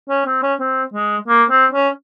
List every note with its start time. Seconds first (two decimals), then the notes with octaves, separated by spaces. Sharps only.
0.09 C#4
0.26 C4
0.42 C#4
0.59 C4
0.93 G#3
1.28 A#3
1.50 C4
1.73 C#4